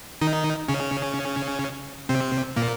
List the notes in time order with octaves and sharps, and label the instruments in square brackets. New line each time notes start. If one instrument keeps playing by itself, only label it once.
[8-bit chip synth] D#3 D#4
C#3 C#4
C3 C4
A#2 A#3